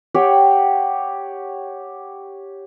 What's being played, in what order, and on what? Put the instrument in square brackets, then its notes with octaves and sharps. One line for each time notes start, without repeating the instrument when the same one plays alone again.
[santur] G4 C#5 F#5 G5